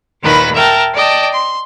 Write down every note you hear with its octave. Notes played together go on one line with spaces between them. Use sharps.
D#2 A#2 D#3 B4 B5 A#6
A#4 E5 G5 A5
D5 D#5 G5 A5
C6